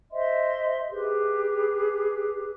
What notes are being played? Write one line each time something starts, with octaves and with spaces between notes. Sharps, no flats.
C5 D#5 E5 C6
G4 G#4 B4